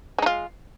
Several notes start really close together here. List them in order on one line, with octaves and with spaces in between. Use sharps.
G#3 D#4 F4